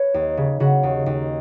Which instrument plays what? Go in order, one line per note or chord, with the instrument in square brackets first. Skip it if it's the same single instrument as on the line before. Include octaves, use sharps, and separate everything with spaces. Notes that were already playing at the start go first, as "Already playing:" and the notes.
Already playing: [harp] B4 C#5
D#2
C#3
C#3 F#4
D#2
D#2